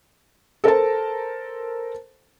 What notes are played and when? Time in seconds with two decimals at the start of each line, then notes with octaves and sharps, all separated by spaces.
0.64 A4 A#4 C5 A5